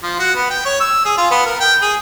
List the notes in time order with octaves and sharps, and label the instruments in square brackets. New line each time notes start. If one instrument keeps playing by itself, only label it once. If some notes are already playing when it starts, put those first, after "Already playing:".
[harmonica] F3
F#4
B3
G5
C#5
E6
G#4
F4
B3
A#4
G5
G#4